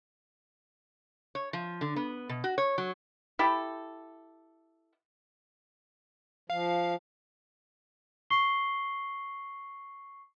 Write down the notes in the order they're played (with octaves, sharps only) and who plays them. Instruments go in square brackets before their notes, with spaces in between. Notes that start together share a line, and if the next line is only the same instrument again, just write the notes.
[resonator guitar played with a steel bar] C#5
F3
D3
B3
B2
F#4
C#5
F#3
[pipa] E4 G4 A4
[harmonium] F3 [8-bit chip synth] F5
[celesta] C#6 C7 G7